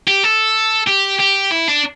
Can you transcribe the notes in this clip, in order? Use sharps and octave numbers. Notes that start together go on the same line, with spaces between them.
G4
A4
G4
G4
E4
D4